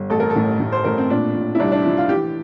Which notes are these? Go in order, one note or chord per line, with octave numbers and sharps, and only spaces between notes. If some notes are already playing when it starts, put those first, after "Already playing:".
Already playing: G1
A1 A4
A#4
A4
A2
A2
C5
A2 A#4
C4
A#2 D4
A#2
E4
C2 D4
D4
F3 E4
F4
E3 G4